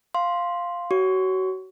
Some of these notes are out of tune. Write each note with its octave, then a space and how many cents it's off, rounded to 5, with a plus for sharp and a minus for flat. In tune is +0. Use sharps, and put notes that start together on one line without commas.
F5 +0 C6 +0
F#4 +30 C#5 +0 C#6 +25